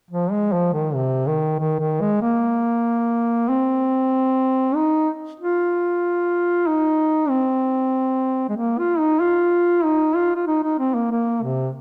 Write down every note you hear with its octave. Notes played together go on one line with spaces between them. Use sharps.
F3
G#3
F3
D#3
C3
D#3
D#3
D#3
G#3
A#3
C4
D#4
F4
D#4
C4
G#3
A#3
F4
D#4
F4
D#4
F4
F4
D#4
D#4
C4
A#3
A#3
C3